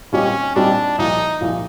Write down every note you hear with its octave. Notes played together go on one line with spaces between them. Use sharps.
A#2 G3 C4 C#4 D#4 G4
A#2 G3 C4 D4 D#4 G4
C2 A#2 F3 D#4
C2 A#2 F3